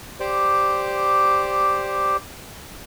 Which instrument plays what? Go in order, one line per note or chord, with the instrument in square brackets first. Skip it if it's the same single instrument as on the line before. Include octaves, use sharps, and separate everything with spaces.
[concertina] G4 C5 D5